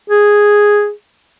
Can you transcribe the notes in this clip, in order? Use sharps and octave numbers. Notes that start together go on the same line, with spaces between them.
G#4